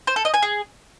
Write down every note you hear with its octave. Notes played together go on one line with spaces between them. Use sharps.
C5
A4
D#5
G#5
G#4